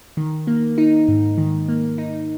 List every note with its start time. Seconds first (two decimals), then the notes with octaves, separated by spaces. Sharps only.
0.17 D#3
0.47 A#3
0.78 D#4
1.08 G#2
1.38 D#3
1.68 A#3
1.98 D#4